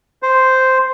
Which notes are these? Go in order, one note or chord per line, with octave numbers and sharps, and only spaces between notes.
C5